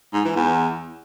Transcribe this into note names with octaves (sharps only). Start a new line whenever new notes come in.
G#2
E3
E2